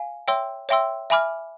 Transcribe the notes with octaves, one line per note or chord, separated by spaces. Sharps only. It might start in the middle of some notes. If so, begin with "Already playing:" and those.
Already playing: F5 G#5
C#5 E5 G5 C6 E6
C#5 E5 G5 C6 E6
E5 G#5 B5 D6 F6